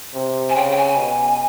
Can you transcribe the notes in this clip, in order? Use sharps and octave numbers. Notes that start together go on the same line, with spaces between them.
C3
G#5
C#3 G5
G5
G#5
B2